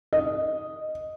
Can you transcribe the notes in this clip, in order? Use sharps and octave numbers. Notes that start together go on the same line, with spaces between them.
D#5